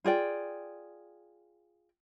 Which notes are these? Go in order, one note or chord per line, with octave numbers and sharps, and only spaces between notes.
F4 G#4 D5 G5